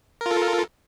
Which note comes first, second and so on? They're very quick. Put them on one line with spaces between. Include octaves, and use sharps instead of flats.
A#4 F4 A4